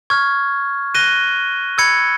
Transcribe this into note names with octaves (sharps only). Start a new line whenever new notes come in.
C#6 F6 G#6
F#6 A#6 D#7 G7
B5 E6 G#6 C#7